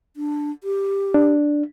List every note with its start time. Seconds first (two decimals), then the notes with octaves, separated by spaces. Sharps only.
0.17 D4
0.64 G4
1.14 D4